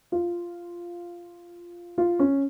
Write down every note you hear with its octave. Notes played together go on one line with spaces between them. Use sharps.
F4
F4
C#4